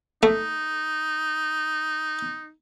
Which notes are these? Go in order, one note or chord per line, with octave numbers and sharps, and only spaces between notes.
A3 D#4